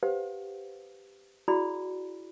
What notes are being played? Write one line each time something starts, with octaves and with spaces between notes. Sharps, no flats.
G4 B4 C5 F5 F#5
E4 F#4 G#4 D5 G5 B5